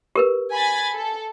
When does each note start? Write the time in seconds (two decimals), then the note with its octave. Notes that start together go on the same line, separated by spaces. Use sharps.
0.16 G4 A#4 B4
0.52 G#5 B5 A6
0.93 A4